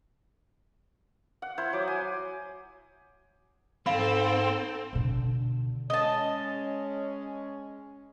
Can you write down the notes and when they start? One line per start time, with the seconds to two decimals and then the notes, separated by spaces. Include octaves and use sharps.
1.42 F#5
1.58 E4 C5
1.73 F#3 D6 D#6
1.88 G#5
3.86 G#2 C4 A4 F5 B5
4.93 B2 D3
5.90 G#3 C#4 D#5 A5